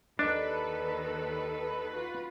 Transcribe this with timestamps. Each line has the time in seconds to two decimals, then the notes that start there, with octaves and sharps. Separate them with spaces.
0.19 D#2 D#3 D4 A4 B4 D5 D#5
1.95 F4 F#4